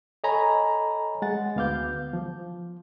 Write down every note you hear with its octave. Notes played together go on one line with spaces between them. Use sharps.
A4 C#5 D#5 G#5 A#5 B5
G#3 F#5 A6
D2 B3 F5 D6 G6
F3